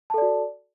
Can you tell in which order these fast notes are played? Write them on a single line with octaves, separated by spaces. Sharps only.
A5 A4 D5 F#4